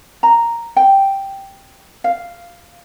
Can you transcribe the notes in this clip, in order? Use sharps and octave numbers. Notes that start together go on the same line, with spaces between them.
A#5
G5
F5